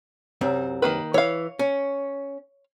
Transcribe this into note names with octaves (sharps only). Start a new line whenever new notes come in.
C2 F#2 C4
D#3 A#3 B4
E3 C#5 F5
C#4